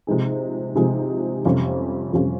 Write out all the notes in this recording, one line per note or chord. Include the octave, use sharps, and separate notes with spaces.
C3 F3 G#3 D#4 G#4
C3 F3 G#3 D#4 G#4
F2 C3 G3 C#4 F4
F2 C3 G3 C#4 F4